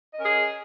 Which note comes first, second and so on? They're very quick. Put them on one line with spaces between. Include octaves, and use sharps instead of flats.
D#5 C#4 A#4 G#4